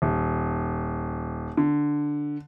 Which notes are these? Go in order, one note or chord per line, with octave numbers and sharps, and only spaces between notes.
D#1
D3